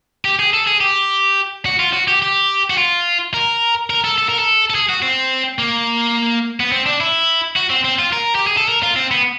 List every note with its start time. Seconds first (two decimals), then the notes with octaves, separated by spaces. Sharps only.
0.25 G4
0.39 G#4
0.53 A4
0.67 G#4
0.81 G4
1.65 F#4
1.79 F4
1.93 F#4
2.08 G4
2.22 G4
2.70 F#4
2.78 F4
3.34 A#4
3.90 A#4
4.04 A4
4.18 A4
4.29 A#4
4.39 A4
4.70 A4
4.75 G#4
4.89 F#4
5.02 C4
5.59 A#3
6.60 B3
6.72 C4
6.86 D4
7.00 E4
7.56 F#4
7.70 C4
7.84 C4
7.99 F4
8.13 A#4
8.35 G4
8.47 G#4
8.57 A4
8.69 A#4
8.83 F4
8.96 C4
9.11 B3